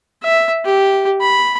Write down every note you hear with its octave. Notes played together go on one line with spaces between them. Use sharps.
E5
G4
B5